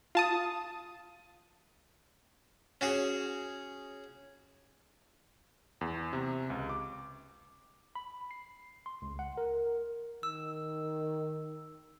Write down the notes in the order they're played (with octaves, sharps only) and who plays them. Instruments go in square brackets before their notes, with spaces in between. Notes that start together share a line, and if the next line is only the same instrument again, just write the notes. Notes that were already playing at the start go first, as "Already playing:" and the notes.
[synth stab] F4 A5 D#6
[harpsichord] C#4 F#4 G#4
[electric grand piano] E2
C3
C#2
D6
[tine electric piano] B5
C7
C6
C#2
F#5
A#4
[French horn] D#3 [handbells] E6